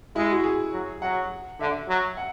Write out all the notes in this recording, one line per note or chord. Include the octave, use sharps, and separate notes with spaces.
G#3 E4
F#4
G#4
F#3
F#3 F#5
D3 E5
F#3
F#5